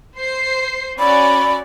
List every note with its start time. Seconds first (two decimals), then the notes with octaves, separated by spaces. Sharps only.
0.17 C5 C7
0.99 C#4 F#4 D5 B5